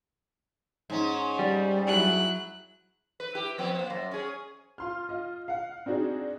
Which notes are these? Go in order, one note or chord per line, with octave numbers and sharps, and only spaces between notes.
G#2 C#4
G3
F#3 E4 F#6
B4
E4 G4
F3 B3 C4
A#3 C5
F#2
C#4 G#4
F4 C6 F6
F4 D#5
F5 F#5
C4 D4 D#4 F#4 G#4